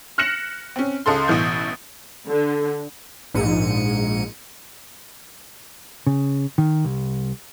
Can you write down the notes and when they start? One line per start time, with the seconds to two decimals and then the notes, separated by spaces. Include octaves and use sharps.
0.18 F6 F#6 A#6 C#7 E7 F#7
0.76 C4 C#4
1.06 C#2 C#3 A4 C6
1.28 A1 B2 E3 G6
2.28 D3
3.34 A#1 G#2 C#7 D#7
6.07 C#3
6.58 D#3
6.85 C2